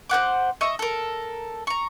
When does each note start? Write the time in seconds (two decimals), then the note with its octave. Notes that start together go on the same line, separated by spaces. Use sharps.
0.10 C5 C#5 F#5 D6
0.61 D#5 E5 C#6
0.79 A4 A#4
1.67 A#5 C#6